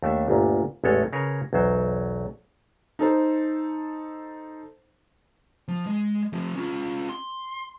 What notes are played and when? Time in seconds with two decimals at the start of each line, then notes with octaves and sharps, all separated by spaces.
0.03 D#2 A3 D4 E5
0.28 G1 D2 A#2
0.84 A1 E2 G#3 A3 A4 C#5
1.13 C#3 G#4 A#4 B4 C#5
1.53 B1 E2 F#3 C5
2.99 D#4 A4 C5
5.68 F3
5.86 G#3
6.33 F3 A3
6.55 C#4 F4
7.09 C6